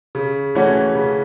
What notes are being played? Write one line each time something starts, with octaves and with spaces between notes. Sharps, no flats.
C#3
E3 A3 C#4 F#4
C#3